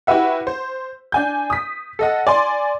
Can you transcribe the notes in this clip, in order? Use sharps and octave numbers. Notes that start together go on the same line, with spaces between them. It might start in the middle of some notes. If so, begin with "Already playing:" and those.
E4 F#4 G4 B4 E5 F#5
C5
D4 G#5 G6
D#6 B6
A4 D#5 F#5
D5 G#5 C6